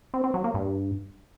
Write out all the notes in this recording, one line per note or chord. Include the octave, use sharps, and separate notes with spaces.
C4
C4
F#3
A#3
G2